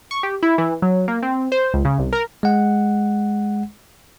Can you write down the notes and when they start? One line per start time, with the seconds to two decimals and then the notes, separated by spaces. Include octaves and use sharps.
0.11 C#6
0.23 G4
0.43 E4
0.58 E3
0.82 F#3
1.08 A#3
1.23 C4
1.52 C5
1.74 C#2
1.85 C#3
1.98 C2
2.13 A#4
2.43 G#3 F#5